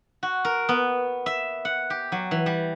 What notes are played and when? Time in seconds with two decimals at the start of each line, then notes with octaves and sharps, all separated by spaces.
0.23 F#4
0.45 A#4
0.69 B3
1.26 E5
1.65 F#5
1.90 G4
2.12 F#3
2.31 E3
2.46 G3